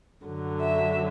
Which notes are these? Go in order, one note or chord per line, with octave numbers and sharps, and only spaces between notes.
F#2 D3 F#3
E5